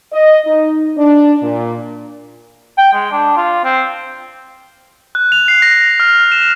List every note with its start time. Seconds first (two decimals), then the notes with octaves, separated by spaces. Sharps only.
0.12 D#5
0.47 D#4
0.97 D4
1.42 A#2
2.78 G5
2.94 G#3
3.11 D4
3.37 F4
3.64 C4
5.15 F#6
5.32 F7
5.48 C7
5.62 A#6
6.00 F6
6.32 E7